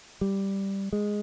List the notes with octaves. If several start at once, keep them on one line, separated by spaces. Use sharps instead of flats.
G3
G#3